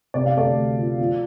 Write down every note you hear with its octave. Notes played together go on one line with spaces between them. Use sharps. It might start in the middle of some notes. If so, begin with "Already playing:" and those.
C3 D5
F5
D2 A4 D5
D2
F3
F3